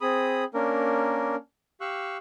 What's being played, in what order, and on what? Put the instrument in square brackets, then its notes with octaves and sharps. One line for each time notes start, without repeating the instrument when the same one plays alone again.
[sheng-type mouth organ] C4 G#4 B5 D#6
A#3 C#4 D4 A#4
G4 F5 C#6 E6 F#6